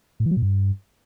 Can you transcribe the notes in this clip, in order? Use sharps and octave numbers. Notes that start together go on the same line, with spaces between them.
A2
E3
F#3
A#2
G2